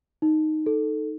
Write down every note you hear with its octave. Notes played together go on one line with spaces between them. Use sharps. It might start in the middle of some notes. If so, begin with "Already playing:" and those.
D#4
A4